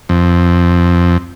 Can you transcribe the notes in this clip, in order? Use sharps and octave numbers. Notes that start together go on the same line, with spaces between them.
F2